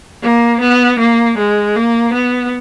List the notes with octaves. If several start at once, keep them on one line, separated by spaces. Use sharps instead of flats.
A#3
B3
A#3
G#3
A#3
B3